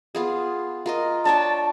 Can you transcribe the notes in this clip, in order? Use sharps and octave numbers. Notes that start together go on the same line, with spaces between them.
B3 F4 G#4
F4 A#4 D#5
D4 C#5 G5 A5